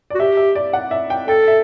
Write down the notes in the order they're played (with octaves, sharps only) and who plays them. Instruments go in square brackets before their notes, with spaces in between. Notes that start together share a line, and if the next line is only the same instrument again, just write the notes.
[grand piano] D5
[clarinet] F#4
[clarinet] G4 [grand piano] E5
[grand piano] E5
D5
F#5
E5
G5
[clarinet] A4 [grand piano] G5
[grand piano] E5